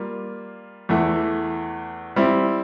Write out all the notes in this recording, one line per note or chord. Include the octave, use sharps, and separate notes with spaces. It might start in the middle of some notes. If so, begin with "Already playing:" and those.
Already playing: G3 A#3 F4
E2 E3 A3
G3 C4 E4